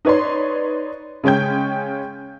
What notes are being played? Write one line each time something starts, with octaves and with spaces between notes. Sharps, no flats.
D#4 B4 C#5 D5 C6
C#3 G#3 C#4 G5 G6